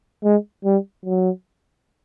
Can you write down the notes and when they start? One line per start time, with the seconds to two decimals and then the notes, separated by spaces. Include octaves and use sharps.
0.24 G#3
0.65 G3
1.05 F#3